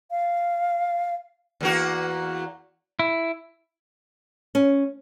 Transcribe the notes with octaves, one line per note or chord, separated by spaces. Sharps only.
F5
E2 A#3 F#4
E4
C#4